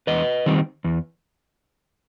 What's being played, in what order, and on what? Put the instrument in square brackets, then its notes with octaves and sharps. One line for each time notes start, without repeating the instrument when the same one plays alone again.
[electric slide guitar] E2 B4 D#5
D#3 G3 C4
E2